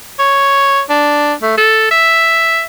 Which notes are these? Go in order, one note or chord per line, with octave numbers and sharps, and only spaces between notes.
C#5
D4
A3
A4
E5